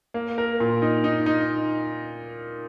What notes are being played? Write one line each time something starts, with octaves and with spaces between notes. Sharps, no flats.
A#3
A#4
A#2
D#4
D#4
D#4